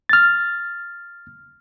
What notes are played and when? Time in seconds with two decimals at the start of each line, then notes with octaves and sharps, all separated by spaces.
0.09 F6 A6